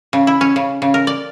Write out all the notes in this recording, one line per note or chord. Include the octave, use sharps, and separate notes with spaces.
C#3
E4
C#4
C#3
C#3
A#4
D5